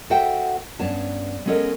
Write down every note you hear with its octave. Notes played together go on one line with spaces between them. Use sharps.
F#4 A4 C5 E5 F#5 G5
G2 B3 C#4 C#5 A5
G#3 B3 C#4 A4 A#4 D#5